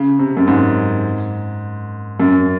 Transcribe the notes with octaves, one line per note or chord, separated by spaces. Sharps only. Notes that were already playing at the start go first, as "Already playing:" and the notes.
Already playing: C#3
C3
F#2
G#2
F#2